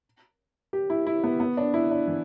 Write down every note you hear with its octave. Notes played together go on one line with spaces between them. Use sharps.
G4
E4
E4
B3
B3
D4
E4
D4
E3